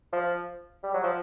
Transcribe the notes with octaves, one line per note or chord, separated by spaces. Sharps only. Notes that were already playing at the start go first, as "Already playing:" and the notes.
F3
G3
F#3
F3